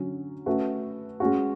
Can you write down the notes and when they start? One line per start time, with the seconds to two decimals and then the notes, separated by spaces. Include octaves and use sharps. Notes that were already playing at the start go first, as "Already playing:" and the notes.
Already playing: D3 F#3 C#4
0.46 A3 C#4 F#4 B4
1.20 G#3 C#4 F#4